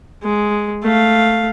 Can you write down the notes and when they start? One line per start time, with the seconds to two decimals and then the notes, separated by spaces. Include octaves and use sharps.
0.23 G#3
0.83 A3 F5